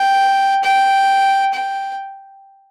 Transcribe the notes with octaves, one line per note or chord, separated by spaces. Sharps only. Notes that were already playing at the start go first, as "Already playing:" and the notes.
Already playing: G5
G5
G5